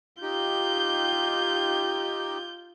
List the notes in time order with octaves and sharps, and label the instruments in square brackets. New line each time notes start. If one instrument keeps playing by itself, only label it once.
[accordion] D#4 G4 [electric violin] F4 G6